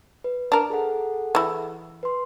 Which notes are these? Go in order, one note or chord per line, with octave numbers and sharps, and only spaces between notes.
B4
D4 A#4
G#4 A4 F#5
E3 E4
B4 C6